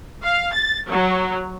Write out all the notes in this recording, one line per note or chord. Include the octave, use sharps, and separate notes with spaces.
F5
A6
F#3